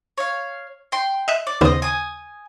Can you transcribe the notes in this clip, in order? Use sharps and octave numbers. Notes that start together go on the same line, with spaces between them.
C#5 F5
G5 C6
D#5 E5 F#6
D5
D#2 C#3 B3 C5 D#5
G#5 D#6